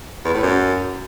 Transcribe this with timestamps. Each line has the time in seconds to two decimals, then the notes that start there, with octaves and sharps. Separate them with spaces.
0.25 E2
0.34 A2
0.43 F#2